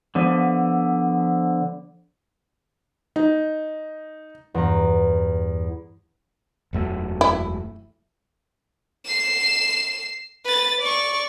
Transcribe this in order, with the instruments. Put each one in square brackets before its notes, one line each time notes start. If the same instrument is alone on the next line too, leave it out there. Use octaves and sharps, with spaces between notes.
[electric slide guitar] D3 F3 B3
[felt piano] D#4
[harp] E2 G2 A#5
[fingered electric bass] E1 F#2 A3
[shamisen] E4
[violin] C7 E7
B4 A6
D5 C#6